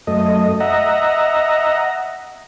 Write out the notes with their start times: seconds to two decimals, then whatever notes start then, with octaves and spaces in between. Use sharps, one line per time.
0.07 F#2 A3 D#5
0.60 D#5 E5 F#5 A#5